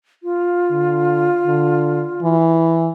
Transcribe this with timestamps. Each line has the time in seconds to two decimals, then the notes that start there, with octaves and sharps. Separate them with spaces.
0.23 F4
0.71 D3
1.47 D3
2.23 E3